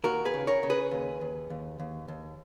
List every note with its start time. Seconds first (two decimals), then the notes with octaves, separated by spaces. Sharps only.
0.04 D#2 F#4 A#4
0.25 G#4 B4
0.34 C#3
0.47 A#4 C#5
0.63 C#3
0.70 G#4 B4
0.91 D#2
1.21 D#2
1.50 D#2
1.80 D#2
2.08 D#2